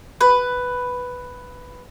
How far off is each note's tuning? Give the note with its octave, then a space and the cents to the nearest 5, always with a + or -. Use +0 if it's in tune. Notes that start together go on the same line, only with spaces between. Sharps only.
B4 +5